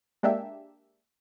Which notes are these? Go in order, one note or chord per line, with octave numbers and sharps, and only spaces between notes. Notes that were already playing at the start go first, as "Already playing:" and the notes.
G#3 A#3 D4 G4 E5